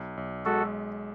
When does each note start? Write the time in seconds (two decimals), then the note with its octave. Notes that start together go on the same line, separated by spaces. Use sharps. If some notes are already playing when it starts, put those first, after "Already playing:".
Already playing: B1
0.17 B1
0.45 G#3 F#4 A4